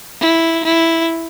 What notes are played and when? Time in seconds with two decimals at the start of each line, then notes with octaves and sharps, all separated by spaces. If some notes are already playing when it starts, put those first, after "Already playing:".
0.21 E4
0.64 E4